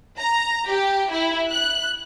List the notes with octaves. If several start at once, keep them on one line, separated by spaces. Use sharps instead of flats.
A#5
G4
E4
F#6